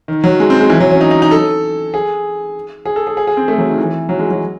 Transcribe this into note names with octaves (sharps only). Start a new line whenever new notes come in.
D#3
F#3
G#3
C4
G#3
E3
F#3
C#4
D#4
D#4
D#4
A4
G#4
G#4
A4
G#4
G#4
G#4
C4
A3
F#3
D#3
E3
F#3
G#3
F#3